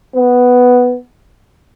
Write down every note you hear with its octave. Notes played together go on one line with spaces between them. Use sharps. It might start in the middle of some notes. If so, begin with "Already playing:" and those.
B3